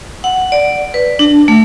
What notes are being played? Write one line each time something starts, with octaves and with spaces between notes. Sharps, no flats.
F#5
D5
B4
D4
A3